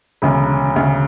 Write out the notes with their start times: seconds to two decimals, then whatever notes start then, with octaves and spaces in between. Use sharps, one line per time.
0.22 E1 D2 C#3
0.76 E1 D2 C#3